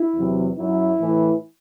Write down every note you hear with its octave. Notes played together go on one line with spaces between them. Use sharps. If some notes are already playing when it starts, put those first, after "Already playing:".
Already playing: E4
E2 C3 F#3
F#2 F#3 E4
A2 E3